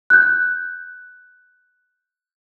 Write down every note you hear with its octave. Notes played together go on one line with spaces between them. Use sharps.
F#6 G6